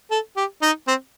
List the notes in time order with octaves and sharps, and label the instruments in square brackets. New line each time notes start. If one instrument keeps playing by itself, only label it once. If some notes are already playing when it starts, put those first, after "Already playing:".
[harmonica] A4
G4
D#4
C4